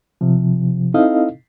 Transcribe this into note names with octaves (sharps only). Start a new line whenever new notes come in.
C3 F3
C4 D#4 E4 A4 D#5 F5